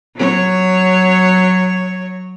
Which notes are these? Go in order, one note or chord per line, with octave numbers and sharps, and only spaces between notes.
F#3 C#5